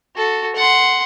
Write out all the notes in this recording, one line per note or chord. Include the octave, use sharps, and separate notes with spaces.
F#4 A4
F#5 C6